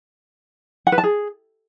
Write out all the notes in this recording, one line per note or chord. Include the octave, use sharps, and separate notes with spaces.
F#5
B4
A5
G#4